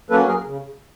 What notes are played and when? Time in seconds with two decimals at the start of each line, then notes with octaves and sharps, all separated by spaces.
0.10 F#3 A#3 C#4 A4 B4
0.28 G#4 A#4
0.45 C#3